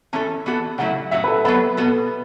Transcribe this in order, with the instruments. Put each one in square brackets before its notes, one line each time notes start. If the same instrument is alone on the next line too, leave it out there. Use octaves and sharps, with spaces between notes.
[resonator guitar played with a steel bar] E3 C#4 E4 A4 [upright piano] A5
[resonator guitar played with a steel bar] E3 B3 F#4 A4
[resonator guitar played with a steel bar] C#3 F#3 A3 E4 [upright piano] F#5
[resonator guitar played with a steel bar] A2 F#3 C#4 F#4 [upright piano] E5
[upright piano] B4
A4
[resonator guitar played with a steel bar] F#3 B3 F#4 A4 [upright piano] B4
[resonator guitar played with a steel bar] B2 B3 F#4 A4